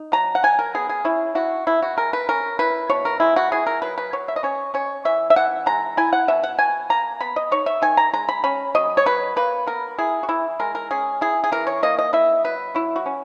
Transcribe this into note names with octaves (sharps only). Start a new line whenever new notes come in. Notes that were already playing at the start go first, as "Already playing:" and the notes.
Already playing: D#4
F#3 A#5
F#5
F#3 G#5
A#4
B3 G#4
G#4
C#4 E4
E4 F#4
B2 E4
F#4
G#3 A#4
B4
C#4 A#4
E4 B4
B2 C#5
A#4
G#3 E4
F#4
E4 G#4
A#4
F#3 B4
B4
F#3 C#5
E5
D#5
C#4 C#5
C#4 C#5
E3 E5
E5
E3 F#5
G#3 A#5
E4 G#5
F#5
B2 E5
F#5
B2 G#5
A#3 A#5
B3 B5
D#5
D#4 C#5
E5
D#3 G#5
A#5
G#3 A#5
B5
C#4 B5
F#3 D#5
C#5
F#3 B4
A#3 B4
B3 A#4
E4 G#4
F#4
E3 E4
G#3 A#4
A#4
C#4 G#4
E4 G#4
G#4
E3 A#4
C#5
A#3 D#5
D#5
E4 E5
F#3 B4
F#3 E4
F#4
C#4